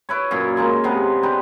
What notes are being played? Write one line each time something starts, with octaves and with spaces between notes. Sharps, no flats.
E4 B4 C#5
F#2 A#2
G#3 A#3 D#4
C3 G#3 B3 B4
D4 D#4 G4 B4